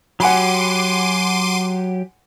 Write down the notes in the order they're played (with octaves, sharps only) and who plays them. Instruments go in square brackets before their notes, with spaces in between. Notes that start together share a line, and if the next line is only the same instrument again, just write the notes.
[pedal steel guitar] F#3 G4 [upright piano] F#5 G#5 B5 [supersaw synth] C6 D6 D#7